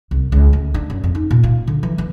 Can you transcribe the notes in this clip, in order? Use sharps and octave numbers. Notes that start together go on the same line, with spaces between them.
C2
C#2
D2
D4
F#2
F2
D#4
A#2
F4
D3
E3
E3